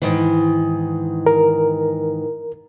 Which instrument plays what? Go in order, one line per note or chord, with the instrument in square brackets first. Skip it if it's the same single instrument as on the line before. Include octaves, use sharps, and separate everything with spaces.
[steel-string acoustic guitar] G#2 D#3 E3
[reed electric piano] A#4